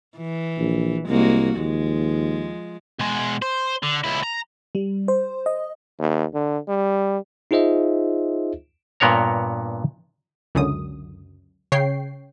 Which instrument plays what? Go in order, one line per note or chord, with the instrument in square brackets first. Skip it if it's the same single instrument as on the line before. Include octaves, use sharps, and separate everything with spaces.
[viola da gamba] E3
[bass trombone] A#1
[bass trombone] C2 [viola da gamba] G#3 A#3 F#4
[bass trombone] D#2 [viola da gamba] F3 G#3
[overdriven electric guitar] B2 G#3
C5
D3
C#2 E4
A#5
[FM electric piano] G3
C5
D#5
[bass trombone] D#2
D3
G3
[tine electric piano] D#4 F4 G#4 C5 D#5 E5
[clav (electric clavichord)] G2 A#2 B3 A#4 C#5 A#5
[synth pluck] C#2 F#2 D3 D#6
C#3 C#5 G5 C7